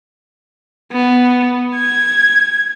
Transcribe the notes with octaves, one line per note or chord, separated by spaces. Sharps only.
B3
G#6